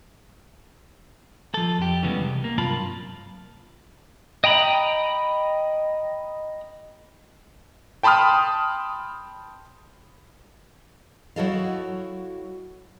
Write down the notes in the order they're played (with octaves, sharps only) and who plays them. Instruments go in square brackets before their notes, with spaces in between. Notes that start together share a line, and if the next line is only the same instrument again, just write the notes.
[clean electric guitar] F3 A4
F2 G4
C#3 E3 G3 G#3 B3
C2
A#3
G2 C3 F#3 F4 A5 B5
[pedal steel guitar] D#5 G5 A#5 B5
[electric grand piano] G5 A5 B5 C6 D#6 F6
[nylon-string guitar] F#3 E4 F#4 A4 D#5 F5